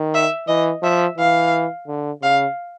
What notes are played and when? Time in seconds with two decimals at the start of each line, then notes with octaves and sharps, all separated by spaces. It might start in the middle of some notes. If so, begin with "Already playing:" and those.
Already playing: D#3
0.14 E5
0.48 E3 D#5
0.83 F3 E5
1.18 E3 F5
1.88 D3
2.22 C#3 F5